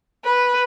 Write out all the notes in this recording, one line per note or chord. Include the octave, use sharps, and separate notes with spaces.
B4